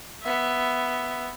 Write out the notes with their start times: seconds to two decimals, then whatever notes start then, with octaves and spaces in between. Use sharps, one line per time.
0.23 B3 E5